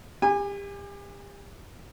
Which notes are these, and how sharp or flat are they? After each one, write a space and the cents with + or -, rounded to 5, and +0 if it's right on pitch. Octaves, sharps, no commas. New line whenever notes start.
G4 +30 G#5 -25